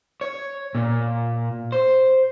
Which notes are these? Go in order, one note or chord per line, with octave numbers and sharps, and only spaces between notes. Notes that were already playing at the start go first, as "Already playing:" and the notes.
C#5
A#2
C5